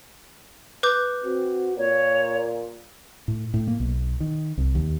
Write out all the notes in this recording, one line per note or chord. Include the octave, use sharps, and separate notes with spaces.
B4 D6 G6
C4 F#4
A#2 C#5
A2
A2
A#3
B1
D#3
C2
D#2